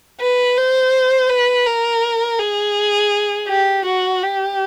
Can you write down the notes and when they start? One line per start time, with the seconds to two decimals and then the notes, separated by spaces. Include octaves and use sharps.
0.20 B4
0.57 C5
1.29 B4
1.66 A#4
2.39 G#4
3.48 G4
3.85 F#4
4.23 G4